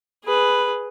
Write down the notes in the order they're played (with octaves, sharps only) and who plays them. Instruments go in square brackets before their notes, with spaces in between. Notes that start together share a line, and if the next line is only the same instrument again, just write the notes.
[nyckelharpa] G#4 B4